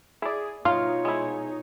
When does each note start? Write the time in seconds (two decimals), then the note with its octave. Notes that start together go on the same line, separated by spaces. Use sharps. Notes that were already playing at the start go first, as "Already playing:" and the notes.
0.22 E4 G#4 D5
0.65 B2 D#4 F4 C#5 F5
1.05 G#3 E4